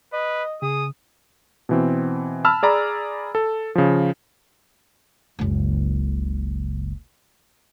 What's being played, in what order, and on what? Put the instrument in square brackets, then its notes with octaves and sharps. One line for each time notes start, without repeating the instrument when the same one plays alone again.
[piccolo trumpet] B4 [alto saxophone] D#5
[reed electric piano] C#3 [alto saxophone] G#4 [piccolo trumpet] D#6
[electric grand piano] B2 E3 C4
A5 B5 E6 F6
G#4 D5 A#5 B5
A4
C#3 F3
[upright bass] F#1 C#2